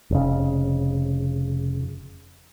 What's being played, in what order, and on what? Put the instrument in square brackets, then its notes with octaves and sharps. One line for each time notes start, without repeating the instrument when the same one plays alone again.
[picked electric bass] F1 C#3